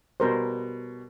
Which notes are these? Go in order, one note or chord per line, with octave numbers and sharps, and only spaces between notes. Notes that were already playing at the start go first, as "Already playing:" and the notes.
B2 G3 A#4 C5